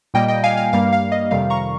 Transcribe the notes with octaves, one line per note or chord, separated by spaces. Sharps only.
A#2 G3 A#3 D#5 G5
D#5 G5
F5 G#5
F5
G2 G3 A#3 F5
F5
D#5
F2 C3 D#3 G3 F5
A#5 C#6